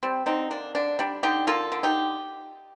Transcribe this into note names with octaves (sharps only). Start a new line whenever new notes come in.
G3 C4
D3 C4 D#4
A#3 D4
D3 D4
G3 D4
D3 D#4 G4
A#3 F4 A4
D3
D#4 G4